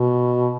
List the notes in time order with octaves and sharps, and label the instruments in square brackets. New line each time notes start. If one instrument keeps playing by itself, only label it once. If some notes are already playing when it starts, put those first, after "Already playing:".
Already playing: [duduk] B2